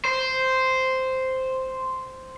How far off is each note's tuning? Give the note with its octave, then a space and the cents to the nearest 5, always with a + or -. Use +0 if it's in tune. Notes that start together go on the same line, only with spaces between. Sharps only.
C5 -5